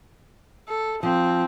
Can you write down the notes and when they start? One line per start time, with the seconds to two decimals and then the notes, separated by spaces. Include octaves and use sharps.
0.69 A4
1.03 F3 C4